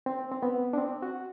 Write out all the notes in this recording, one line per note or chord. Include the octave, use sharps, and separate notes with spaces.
C4
C4
B3
D4
C4
F#4